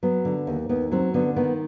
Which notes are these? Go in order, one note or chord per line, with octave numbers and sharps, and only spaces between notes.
F#3 B3
D3
D#2
D#2 B3
F#3 C4
D3 B3
D#3 B3